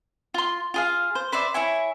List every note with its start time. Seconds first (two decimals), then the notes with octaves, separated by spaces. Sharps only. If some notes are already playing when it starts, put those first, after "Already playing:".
0.34 F4 C6
0.74 F4 G#4 F5
1.15 C5
1.32 B4 C5 D5 E5
1.54 E4 C#5 E5 G#5